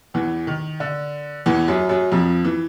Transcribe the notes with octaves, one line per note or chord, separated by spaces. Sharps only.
E2 E3
D#3
D3
E2 E3
F#2 F#3
F#2 F#3
F2 F3
E3